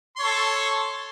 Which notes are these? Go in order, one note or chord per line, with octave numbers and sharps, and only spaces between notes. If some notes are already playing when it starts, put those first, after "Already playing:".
A4 C#5 C6